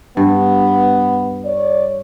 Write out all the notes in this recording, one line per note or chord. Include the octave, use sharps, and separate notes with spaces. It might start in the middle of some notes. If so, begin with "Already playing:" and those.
G2 B3
C#5 D5